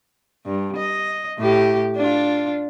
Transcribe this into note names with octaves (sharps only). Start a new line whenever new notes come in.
G2
D#5
A2 G4
D4 F4